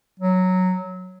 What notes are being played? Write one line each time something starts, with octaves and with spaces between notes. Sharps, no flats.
F#3